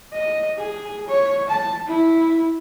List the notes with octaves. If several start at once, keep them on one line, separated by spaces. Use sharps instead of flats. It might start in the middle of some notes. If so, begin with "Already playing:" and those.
D#5
G#4
C#5
A5
E4